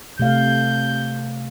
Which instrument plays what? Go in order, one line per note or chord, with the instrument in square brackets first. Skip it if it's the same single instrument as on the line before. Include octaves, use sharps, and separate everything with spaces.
[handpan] C3 A3 F5 [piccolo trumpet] G6